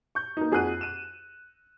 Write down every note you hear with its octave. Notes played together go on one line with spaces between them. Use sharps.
C#6 G6
A#3 D#4
F2 G#4 F#5 F#6 D#7
D#7 E7